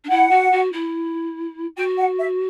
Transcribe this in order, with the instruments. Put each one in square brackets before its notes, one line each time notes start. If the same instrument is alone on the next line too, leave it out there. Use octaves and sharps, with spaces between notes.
[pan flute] D4
[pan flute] E4 [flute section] F#5
[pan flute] F#4
F#4
E4
[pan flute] F#4 [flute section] G5
[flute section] F#5
E5